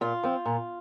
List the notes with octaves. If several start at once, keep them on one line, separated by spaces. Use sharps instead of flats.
A#2 F4
F3 C4
A#2